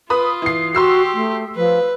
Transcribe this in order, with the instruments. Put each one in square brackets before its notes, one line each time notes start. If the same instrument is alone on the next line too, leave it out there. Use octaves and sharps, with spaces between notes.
[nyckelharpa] F4 [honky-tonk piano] B4 B5 D#6
[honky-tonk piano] E3 C7
[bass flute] F#4 [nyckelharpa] G4 [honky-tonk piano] C6 E6 C7
[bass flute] A3
[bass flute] F3 [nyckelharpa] B4